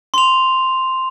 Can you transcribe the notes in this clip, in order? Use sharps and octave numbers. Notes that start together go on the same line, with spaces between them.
C6 F7